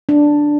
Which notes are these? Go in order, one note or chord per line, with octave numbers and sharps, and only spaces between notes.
D4